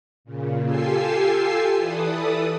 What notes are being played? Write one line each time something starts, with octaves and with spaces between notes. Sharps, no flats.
A#2 C#3
F4 G4 A4 G#5 E6 C7
E3 A4 B4 D5 D#6